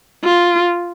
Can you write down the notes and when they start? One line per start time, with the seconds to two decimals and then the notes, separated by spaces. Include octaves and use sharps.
0.24 F4